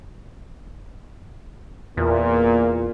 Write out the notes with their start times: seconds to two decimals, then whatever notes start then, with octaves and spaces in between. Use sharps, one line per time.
1.97 E2 A#2